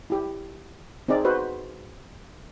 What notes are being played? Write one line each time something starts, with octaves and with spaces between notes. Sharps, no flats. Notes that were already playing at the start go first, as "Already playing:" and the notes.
E4 G4
C4 D#4 G#4 D5
F#4 B4 C5